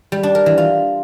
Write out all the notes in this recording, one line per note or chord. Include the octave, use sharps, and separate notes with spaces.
G3
D4
A#4
E3
F4